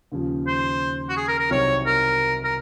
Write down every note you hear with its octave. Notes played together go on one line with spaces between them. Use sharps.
D#2 C#3 F3
C5
F#4
G#4
A#4
A#4
C2 C3 F#3 C4 D#4 C#5
A#4
A#4